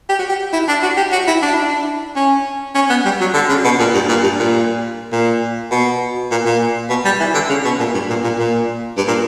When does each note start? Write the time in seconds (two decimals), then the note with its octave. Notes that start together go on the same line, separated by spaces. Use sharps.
0.09 G4
0.19 F#4
0.29 G4
0.53 E4
0.68 D4
0.82 F#4
0.97 G4
1.12 F#4
1.27 E4
1.42 D4
1.54 E4
1.67 D4
2.16 C#4
2.75 C#4
2.90 B3
3.05 G3
3.20 F#3
3.34 D3
3.49 C#3
3.64 B2
3.79 A#2
3.94 G2
4.09 A#2
4.23 G2
4.39 A#2
5.12 A#2
5.71 B2
6.31 A#2
6.46 A#2
6.90 B2
7.05 G3
7.20 E3
7.34 D3
7.49 C#3
7.65 B2
7.79 A#2
7.94 G2
8.09 A#2
8.24 A#2
8.39 A#2
8.97 G2
9.08 A#2